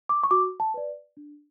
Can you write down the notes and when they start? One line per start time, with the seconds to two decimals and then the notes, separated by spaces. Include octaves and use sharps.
0.09 D6
0.23 C#6
0.31 F#4 D6
0.60 A5
0.74 B4 D5
1.17 D4